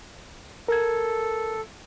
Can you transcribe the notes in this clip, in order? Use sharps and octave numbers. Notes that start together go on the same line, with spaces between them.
A4 A#4 G#6